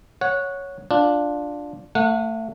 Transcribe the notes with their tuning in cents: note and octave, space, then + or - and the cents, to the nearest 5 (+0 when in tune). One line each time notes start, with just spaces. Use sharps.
C#5 +0 F#5 -15
D4 +0 F4 +10
A3 +25 F#5 -30